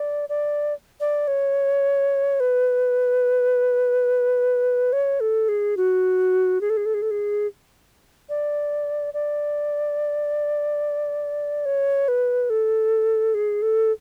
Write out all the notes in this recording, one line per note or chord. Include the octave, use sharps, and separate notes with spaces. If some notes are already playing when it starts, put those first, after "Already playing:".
Already playing: D5
D5
D5
C#5
B4
C#5
A4
G#4
F#4
G#4
A4
G#4
A4
G#4
A4
G#4
D5
D5
C#5
B4
A4
G#4
A4